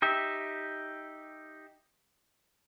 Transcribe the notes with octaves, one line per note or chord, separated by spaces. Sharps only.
D#4 G4 E5